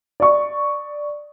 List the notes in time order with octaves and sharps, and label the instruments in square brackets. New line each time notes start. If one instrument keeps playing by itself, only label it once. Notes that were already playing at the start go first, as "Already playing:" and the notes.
[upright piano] D5 C#6